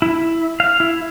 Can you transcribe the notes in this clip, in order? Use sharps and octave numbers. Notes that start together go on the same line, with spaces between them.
E4
F5
E4